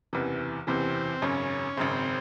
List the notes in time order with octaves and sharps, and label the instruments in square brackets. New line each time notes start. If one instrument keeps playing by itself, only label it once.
[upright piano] F#1 E2 C3 E3
[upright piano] F#1 E2 C3 E3 [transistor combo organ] C4
[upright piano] G#1 F#2 C#3 [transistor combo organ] C#4
[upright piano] G#1 F#2 C#3 [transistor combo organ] C4